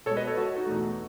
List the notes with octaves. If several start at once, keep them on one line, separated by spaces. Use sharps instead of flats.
B2 G#3 A4 C#5
B4 D#5
A4 C#5
F#4 A4
D#4 F#4
E2 B2 A3